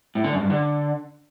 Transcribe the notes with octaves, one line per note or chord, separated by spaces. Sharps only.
A2
D3
F#2
G2
D3